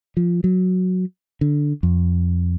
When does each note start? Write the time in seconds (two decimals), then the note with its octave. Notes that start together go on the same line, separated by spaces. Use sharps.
0.17 F3
0.44 F#3
1.41 D3
1.83 F2